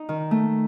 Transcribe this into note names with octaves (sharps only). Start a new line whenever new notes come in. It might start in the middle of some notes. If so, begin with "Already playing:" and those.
Already playing: D#4
D#3
A3